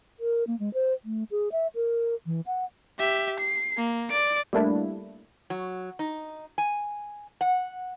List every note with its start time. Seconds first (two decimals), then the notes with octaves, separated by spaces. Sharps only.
0.20 A#4
0.47 A#3
0.59 G#3
0.74 C5
1.05 A3
1.31 G#4
1.52 E5
1.75 A#4
2.26 E3
2.47 F#5
2.99 G4 E5
3.40 C7
3.77 A#3
4.10 D5 D7
4.53 G3 A3 A#3 D4 E4
5.50 F#3
5.99 D#4
6.58 G#5
7.41 F#5